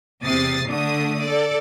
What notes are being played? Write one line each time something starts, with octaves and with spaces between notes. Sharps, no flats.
E2 C3 D#6 A6 C7
D3 A3 D4 D#6
A4 D5